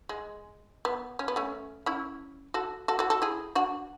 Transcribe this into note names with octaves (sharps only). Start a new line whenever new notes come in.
G#3
B3
C#4
B3
A3 C#4
C#4 E4
F#4 A4
F#4 A4
F#4 A4
F#4 A4
E4 G#4
D4 F#4